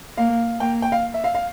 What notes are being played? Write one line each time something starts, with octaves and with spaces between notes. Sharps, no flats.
A#3 F5
A#3 G5
G5
F5
E5
F5
F5